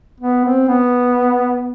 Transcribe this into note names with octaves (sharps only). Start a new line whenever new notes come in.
B3
C4
B3